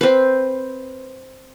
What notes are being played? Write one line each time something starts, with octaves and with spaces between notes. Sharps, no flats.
C4 B4